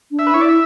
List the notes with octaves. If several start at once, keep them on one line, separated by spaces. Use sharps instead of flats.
D4
E5
B4
E4 C#5
D5
E5